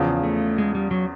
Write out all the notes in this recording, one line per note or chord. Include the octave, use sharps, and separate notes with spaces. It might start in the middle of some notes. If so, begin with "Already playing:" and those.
Already playing: E2 C#3 F3
A3
G#3
G3
F#3